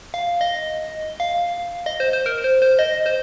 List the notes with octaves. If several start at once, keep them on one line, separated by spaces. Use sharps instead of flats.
F5
D#5
F5
D#5
C5
C5
A#4
C5
C5
D#5
C5